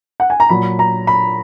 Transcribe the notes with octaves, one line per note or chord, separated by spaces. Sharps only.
F#5
G#5
A#5
A#2 F#3 B5
A#5
B5